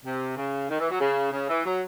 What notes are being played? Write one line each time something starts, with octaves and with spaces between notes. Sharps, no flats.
C3
C#3
D#3
E3
F#3
C#3
C#3
E3
F#3